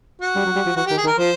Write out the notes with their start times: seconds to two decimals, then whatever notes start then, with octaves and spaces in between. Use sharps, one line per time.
0.21 F#4
0.35 G3
0.45 F#3
0.55 G3
0.66 F3
0.76 E3 F#4
0.87 D#3 G4
0.97 G#4
1.04 D#3
1.07 A#4
1.18 F3 C5